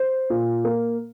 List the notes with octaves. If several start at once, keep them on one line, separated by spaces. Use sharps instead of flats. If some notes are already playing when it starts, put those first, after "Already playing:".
Already playing: C5
A#2
A#3